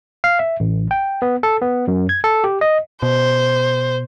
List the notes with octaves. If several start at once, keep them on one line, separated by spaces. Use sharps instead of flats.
F5
E5
A1
G5
B3
A4
B3
F#2
G#6
A4
G4
D#5
B2 C5